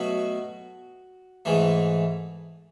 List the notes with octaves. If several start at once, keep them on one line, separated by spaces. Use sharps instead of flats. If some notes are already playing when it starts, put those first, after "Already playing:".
Already playing: B2 F#3 A3 F#4
G#2 E3 A3